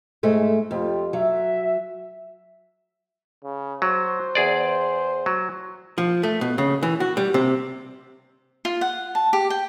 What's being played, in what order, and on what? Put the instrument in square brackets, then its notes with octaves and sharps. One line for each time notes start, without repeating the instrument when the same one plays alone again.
[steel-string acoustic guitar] G#2 G#3 A3
[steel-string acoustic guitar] F2 [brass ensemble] F4 G4
[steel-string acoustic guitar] F#3 [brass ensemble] E5
[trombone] C#3
[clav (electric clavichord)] F#3 [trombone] C5
[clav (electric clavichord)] E2 G#4 D5
F#3
[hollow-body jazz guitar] F3
A3
B2
C#3
E3
F#4
G3
C3
[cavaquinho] F4
F#5
A5
G4
G5